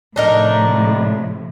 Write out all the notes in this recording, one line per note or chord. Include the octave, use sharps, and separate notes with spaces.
A2 C3 F3 D4 D#4 A#4